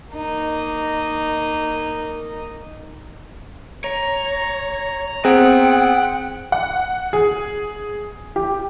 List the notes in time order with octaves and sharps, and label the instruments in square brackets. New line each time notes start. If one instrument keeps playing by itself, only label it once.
[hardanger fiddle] A#3 D#4
[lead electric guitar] C#5 [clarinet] A#5
[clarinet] B3 [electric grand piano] C4 G#4 [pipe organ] F#5 [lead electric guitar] G5
[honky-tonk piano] F#5
G#4
G4